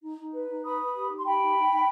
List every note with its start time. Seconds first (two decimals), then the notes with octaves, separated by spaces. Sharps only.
0.03 D#4
0.18 D#4
0.33 B4
0.49 D#4
0.64 B4 B5 D#6
0.80 B4
0.94 G4
1.09 D#4
1.17 C6
1.24 G4 G5 B5
1.40 D#4
1.56 D#4
1.70 D#4